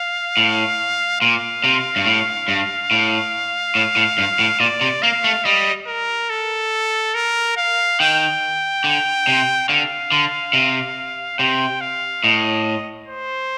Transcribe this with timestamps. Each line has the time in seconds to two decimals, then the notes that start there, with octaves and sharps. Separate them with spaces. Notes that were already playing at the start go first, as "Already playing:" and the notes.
Already playing: F5
0.37 A2
1.21 A#2 F5
1.64 C3
1.96 G2
2.06 A2
2.48 G2
2.91 A2
3.75 A2
3.96 A2
4.18 G2
4.39 A2
4.60 A#2 D5
4.81 C3
5.02 A#3 F5
5.24 A3
5.45 G3 D#5
5.87 A#4
6.30 A4
7.15 A#4
7.57 F5
8.00 D#3 G5
8.84 D3
9.27 C3
9.69 D3 F5
10.12 D3
10.53 C3
11.39 C3 G5
11.81 F5
12.24 A2 D#5
13.08 C5